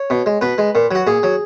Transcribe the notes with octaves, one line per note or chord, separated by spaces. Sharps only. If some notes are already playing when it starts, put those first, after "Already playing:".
Already playing: C#5
B2
G#3
B2 B4
G#3
A#2
F#3 F#4
A#2 G#4
F#3